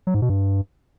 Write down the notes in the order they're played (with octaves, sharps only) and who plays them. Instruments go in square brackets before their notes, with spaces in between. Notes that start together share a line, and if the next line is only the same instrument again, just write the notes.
[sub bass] F#3
G#2
B2
G2